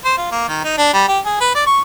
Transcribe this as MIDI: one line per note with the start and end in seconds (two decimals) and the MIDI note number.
0.05 0.14 72
0.18 0.30 65
0.32 0.48 58
0.48 0.64 51
0.64 0.75 63
0.78 0.90 62
0.93 1.06 55
1.08 1.19 67
1.25 1.37 68
1.41 1.51 71
1.55 1.66 74
1.66 1.81 85